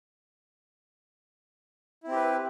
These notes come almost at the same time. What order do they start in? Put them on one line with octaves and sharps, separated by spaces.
E4 C4 G4 B4